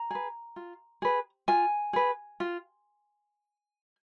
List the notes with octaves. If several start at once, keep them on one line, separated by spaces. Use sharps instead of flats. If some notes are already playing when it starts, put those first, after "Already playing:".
Already playing: A#5
G#4 B4
F4
G#4 B4
F4 G#5
G#4 B4
F4